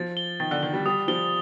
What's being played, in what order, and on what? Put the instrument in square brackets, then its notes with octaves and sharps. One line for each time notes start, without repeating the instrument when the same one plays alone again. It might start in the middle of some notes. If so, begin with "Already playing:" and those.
Already playing: [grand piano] F3 [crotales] A6
[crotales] G7
[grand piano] D#3 [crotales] A6
[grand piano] D3
[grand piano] D#3 [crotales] G7
[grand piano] G3
[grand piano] G3 [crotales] D#6
[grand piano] F3 [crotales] G7